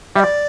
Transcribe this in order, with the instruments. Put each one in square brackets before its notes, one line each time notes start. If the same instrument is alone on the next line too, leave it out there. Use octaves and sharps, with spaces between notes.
[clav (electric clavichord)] G3 [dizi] E5
[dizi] D5